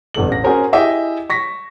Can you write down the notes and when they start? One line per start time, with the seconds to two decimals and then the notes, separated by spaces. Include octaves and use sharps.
0.14 G1 E2 A4 F#7
0.29 A1 A#6
0.44 C#4 F#4 G#4 A#4 C5
0.73 E4 G4 G#4 D#5 E5 G5
1.30 C#6 A#6 B6